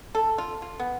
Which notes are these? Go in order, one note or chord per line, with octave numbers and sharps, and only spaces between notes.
A4
F4
F4
B3